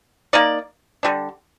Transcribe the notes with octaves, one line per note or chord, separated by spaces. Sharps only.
A#3 D#4 A#4 D5
D3 G3 D4